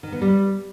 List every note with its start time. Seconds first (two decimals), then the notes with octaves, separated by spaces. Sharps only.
0.03 D#3
0.12 B3
0.22 G3